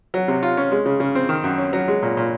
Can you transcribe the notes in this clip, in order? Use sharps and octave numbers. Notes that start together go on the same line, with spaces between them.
F#3
C3
F4
C#4
G#3
C#3
C#3
C4
D#3
F#2
C#4
F#3
G#3
A#2
A#2